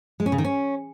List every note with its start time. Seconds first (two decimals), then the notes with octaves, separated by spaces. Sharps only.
0.20 G#3
0.26 C#4
0.32 C#3
0.38 D#3
0.45 C#4